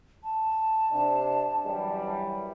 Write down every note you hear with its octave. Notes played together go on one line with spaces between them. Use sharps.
A5
C3 D4
F#2 E3 G3